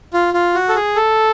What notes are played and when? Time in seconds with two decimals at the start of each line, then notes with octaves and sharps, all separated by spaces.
0.14 F4
0.34 F4
0.55 F#4
0.69 A4
0.75 G#4
0.96 A4